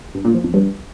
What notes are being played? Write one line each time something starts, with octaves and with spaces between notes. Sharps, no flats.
G2
A#2
F3
F2
G2